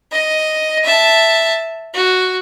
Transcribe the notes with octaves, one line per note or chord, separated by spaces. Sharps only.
D#5
E5 A5
F#4